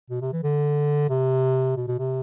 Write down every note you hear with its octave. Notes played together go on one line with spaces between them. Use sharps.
B2
C3
E3
D3
C3
B2
B2
C3